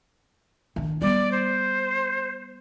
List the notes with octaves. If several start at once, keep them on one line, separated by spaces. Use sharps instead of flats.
D#3 D4
G3 B3 D5
C5